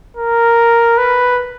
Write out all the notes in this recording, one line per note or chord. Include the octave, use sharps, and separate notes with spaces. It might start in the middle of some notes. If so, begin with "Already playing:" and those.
A#4
B4